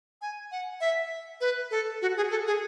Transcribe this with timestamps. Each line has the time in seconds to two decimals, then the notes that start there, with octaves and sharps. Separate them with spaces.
0.22 G#5
0.52 F#5
0.81 E5
1.41 B4
1.71 A4
2.02 F#4
2.17 G#4
2.31 A4
2.47 G#4